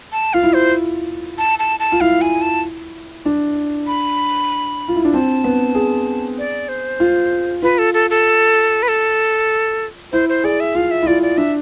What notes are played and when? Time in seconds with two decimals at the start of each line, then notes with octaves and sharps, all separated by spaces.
0.12 A5
0.33 F4 F5
0.43 E4
0.54 C5
1.38 A5
1.59 A5
1.80 A5
1.92 F4
2.01 E4 F5
2.21 G#5
2.42 A5
3.25 D4
3.87 B5
4.88 F4
4.96 E4
5.05 D4
5.12 C4 A5
5.44 B3
5.75 G#4
6.38 D5
6.69 C5
7.00 F4
7.63 F4 B4
7.78 A4
7.94 A4
8.10 A4
8.83 B4
8.88 A4
10.12 E4 C5
10.29 C5
10.44 G#4 D5
10.60 E5
10.75 F4 F5
10.91 E5
11.02 E4
11.07 F4 D5
11.22 D5
11.37 D4 E5